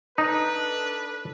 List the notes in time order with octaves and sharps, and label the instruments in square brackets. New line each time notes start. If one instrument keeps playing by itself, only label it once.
[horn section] D4 A4 B4 [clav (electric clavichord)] D#4